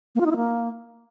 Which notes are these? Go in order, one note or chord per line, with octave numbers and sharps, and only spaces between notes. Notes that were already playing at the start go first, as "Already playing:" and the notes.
A#3
F4
D#4
E4
A#3